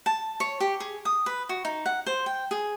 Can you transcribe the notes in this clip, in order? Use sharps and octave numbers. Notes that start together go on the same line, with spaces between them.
A5
C#5
G4
G#4
D#6
B4
F#4
D#4
F#5
C5
G5
G#4